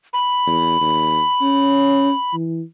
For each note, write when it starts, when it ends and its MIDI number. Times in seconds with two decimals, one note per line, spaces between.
0.13 2.35 83
0.47 0.78 40
0.81 1.21 39
1.42 2.12 61
2.34 2.62 52